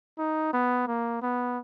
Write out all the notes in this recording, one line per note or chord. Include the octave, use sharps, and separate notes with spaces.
D#4
B3
A#3
B3